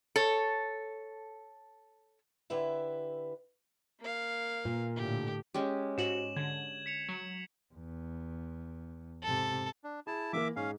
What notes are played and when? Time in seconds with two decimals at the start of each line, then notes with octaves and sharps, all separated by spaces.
0.16 A4 C#5
2.50 D3 E4 G4 B4 E5
4.00 A#3 F5
4.65 A#2
4.96 A2 D3 G4
5.54 G#3 C#4 G4
5.98 G#2 F#4 E7 F#7
6.36 D3 G#6
6.86 B6 C#7 F7
7.09 F#3
7.74 E2
9.23 G#2 C3 A4
9.84 D4
10.07 E4 G#4 A5
10.33 E3 A#3 A#4 E5 D6
10.56 G#2 C#4 F5